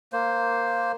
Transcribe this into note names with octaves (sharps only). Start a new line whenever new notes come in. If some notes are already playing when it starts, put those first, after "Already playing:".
A#3 C5